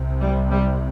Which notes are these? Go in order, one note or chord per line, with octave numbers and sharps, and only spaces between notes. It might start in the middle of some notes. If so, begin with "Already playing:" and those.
Already playing: C2 C3
G3
G3